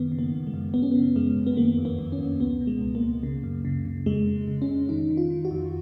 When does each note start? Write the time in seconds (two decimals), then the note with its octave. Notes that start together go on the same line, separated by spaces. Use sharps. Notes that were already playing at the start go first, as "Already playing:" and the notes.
Already playing: F#2 D#3 B3
0.12 C#3
0.19 A#3
0.33 F#2
0.47 G#3
0.54 F#2
0.74 F#2 B3
0.83 C#4
0.91 C#3 B3
1.16 F#2 G#3
1.36 F#2
1.47 B3
1.57 D#3 A#3
1.78 F2
1.85 B3
1.99 F2
2.12 C#4
2.19 F2
2.40 C#2 B3
2.61 B2
2.67 G#3
2.81 C#2
2.95 A#3
3.03 C#2
3.23 C#3
3.43 F#2
3.65 C#3
3.85 C#3
4.06 F2 G#3
4.27 C#3
4.48 C#3
4.62 C#4
4.69 F2
4.89 D#3 D#4
5.11 D#3
5.17 F4
5.30 D#3
5.45 F#4
5.51 F2